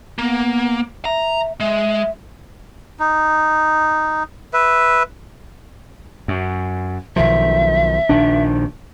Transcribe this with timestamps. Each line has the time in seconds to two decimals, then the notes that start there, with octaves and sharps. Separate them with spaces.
0.18 A#3 B3
1.05 E5 A#5
1.60 G#3 E5
3.00 D#4
4.53 B4 E5
6.28 F#2
7.16 B1 D#3 F3 E5
8.09 A#1 D#3 D4